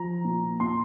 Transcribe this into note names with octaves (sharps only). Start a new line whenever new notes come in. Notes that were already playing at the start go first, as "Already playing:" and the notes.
Already playing: F3 A#5
A#2
A#2 C6